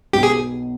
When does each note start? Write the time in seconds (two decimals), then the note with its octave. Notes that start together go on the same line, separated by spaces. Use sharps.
0.13 B1 B2 B3 G4
0.23 G#4